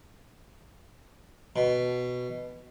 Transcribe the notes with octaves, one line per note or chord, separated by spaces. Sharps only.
B2